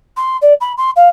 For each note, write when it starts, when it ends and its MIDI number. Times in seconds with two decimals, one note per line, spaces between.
0.16 0.37 84
0.41 0.53 74
0.61 0.73 83
0.77 0.90 84
0.96 1.08 77